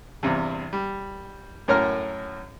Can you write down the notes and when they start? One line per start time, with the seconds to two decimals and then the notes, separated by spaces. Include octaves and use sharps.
0.23 E2 G2 C3
0.73 G3
1.68 F#2 A2 C#4 A#4 A#5 F6